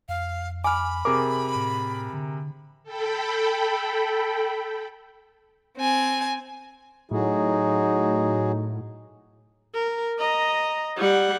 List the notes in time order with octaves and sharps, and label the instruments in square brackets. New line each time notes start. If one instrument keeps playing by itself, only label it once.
[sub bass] F2 [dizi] F5
[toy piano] G#5 [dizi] B5 [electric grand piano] D6 F6
[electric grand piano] C3 G#4 A#4 [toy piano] D6
[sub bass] A2
D3
[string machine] A4 G5 B5
[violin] C4 G#5
[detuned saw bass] A2 [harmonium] F#3 F#4 G#4 [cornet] D#4
[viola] A#4
D#5 A#5
G3 F#5